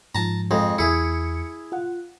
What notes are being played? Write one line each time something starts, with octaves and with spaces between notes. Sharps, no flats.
G#2 F3 A5 A#5
F2 G#3
E2 E4 G#4 C#7
F4 F#5